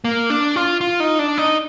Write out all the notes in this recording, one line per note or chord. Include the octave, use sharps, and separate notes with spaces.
A#3
D4
F4
F4
D#4
D4
D#4